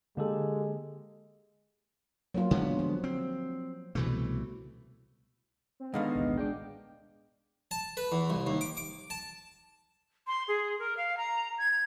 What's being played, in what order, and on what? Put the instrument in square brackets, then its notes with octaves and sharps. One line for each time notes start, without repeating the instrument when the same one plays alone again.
[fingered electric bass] D3 [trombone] G#3 [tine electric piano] A#3 G4 A4
[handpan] F#3 A#3 F4
[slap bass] D3 G#3 B3
[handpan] F3
[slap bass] C4
[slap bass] C2 E3 A3 [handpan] B2
[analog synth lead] C4
[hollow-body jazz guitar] G#2 D3 D#3 [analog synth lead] B3 [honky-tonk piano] D#5 F5
[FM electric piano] A1 D2 B2
[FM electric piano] G#3 D4 D6 [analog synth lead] G5
[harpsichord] A5
B4
E2
C2
D#2
D6
D6
A5
[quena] C6
G#4
A#4
F5
A#5
G#6